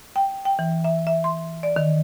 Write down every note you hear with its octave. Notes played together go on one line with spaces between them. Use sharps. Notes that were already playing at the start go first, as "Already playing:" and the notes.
G5
G5
E3
E5
E5
C6
D5
D#3